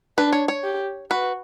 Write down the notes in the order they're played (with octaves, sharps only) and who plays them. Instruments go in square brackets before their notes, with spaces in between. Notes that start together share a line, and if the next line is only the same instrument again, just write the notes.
[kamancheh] D4 [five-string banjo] B4
[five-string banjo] C#5
C#5
[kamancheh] G4
[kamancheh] F#4 [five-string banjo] B4